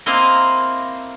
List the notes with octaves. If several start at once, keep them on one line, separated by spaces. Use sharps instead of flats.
A#3 C4 E4 C5 D#5 F5